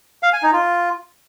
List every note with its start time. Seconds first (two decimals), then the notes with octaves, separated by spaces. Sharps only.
0.23 F5
0.33 G#5
0.43 D#4
0.53 F4